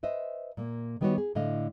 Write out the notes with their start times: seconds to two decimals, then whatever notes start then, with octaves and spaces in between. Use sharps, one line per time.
0.03 B4 C5 D#5 E5
0.57 A#2 A#3
1.01 D#3 G3 B3 D#4 F#4 C#5
1.18 G#4
1.35 A2 D3 D#5 F5